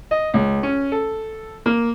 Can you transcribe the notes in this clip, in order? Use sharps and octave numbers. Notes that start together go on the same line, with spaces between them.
D#5
C#2
C#4
A4
A#3